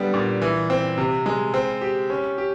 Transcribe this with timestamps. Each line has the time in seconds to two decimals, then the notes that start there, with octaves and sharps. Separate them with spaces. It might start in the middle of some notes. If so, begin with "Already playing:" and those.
Already playing: D3 G3 B3
0.14 A#2
0.42 E3
0.70 C4
0.97 C3
1.26 G#3
1.54 C4
1.82 G4
2.10 C#4
2.38 G4